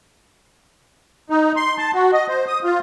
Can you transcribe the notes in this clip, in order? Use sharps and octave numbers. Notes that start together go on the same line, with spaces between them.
D#4
C6
A5
F#4
D#5
C5
D#6
F4